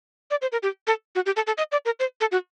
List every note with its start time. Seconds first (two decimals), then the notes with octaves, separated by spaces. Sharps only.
0.31 D5
0.42 C5
0.52 A#4
0.63 G4
0.87 A4
1.15 F#4
1.26 G4
1.36 A4
1.47 A4
1.58 D#5
1.72 D5
1.85 A#4
2.00 C5
2.21 A4
2.32 F#4